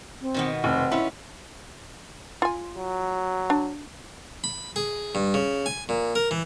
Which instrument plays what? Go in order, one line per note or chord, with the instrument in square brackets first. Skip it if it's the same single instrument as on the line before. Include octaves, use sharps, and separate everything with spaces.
[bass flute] C4
[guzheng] B2 D#3 B3
[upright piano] F1 [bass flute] C4
[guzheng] C#4 F4 B4 [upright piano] E4
[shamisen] F4 G#5
[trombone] F#3
[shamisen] D4
[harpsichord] B5
G#4
G2
C#3
G#5
A#2
A#4
E3